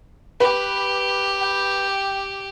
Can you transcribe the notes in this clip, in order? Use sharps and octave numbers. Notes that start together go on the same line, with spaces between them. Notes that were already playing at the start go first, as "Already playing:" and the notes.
G4 B4
G5